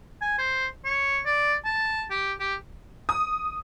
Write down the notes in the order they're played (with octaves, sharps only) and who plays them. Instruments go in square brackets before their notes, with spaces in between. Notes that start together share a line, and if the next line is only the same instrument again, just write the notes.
[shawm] G#5
C5
C#5
D5
A5
G4
G4
[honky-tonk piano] D#6